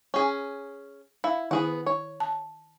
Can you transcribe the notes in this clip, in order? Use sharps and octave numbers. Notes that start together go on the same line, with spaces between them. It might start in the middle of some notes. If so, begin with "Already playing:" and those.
C#4 G#4
E4 F5
D#3 B3 E4 G#4 F#5
C#5
A5